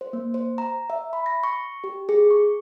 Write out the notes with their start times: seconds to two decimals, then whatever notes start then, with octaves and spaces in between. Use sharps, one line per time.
0.01 C5
0.13 A#3
0.34 C5
0.58 A#5
0.90 E5
1.13 B5
1.26 A#6
1.43 C#6
1.84 G4
2.09 G#4
2.31 C#6